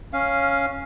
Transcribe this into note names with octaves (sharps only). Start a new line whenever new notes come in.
C#4 F5